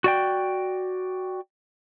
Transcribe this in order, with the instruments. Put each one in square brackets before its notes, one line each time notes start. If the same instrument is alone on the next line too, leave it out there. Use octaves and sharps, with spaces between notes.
[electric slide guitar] F#4 D5 G5